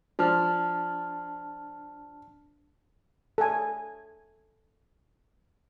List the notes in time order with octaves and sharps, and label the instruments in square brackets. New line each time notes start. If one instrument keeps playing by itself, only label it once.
[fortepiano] F3 [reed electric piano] D4 A5 F6
[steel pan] A4 G#5